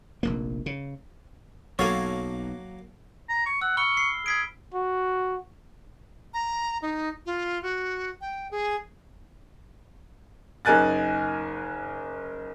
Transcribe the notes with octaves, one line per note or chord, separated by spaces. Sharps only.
F1 A#1 A#3
C#3
B1 F#3 A#3 A4 C#5 F5 G#5
A#5
C#6
F#5 E6
B5 C#6 F6 G7
C7
G#4 G#6 B6 D7
F#4
A#5
D#4
F4
F#4
G5
G#4
F#1 D#4 A#4 G#5 F#6 A6